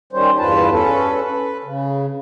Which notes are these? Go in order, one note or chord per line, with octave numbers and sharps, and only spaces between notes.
D#3 G3 C#4 C5
E2 G2 F4 B4 A5
C#4 A4 B4
B4
C#3